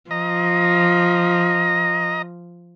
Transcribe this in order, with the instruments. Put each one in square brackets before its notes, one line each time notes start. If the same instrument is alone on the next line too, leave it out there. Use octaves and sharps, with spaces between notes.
[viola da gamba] F3 [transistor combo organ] D#5 A#5